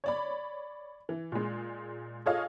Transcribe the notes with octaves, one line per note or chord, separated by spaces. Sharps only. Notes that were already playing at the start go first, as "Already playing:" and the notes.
C#5 D5 B5
E3
A#2 G#3
F4 G#4 A4 C#5 D#5 F5